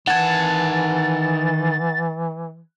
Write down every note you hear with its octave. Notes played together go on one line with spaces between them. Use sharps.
D#3 E3 F#5 A5 G#6 A6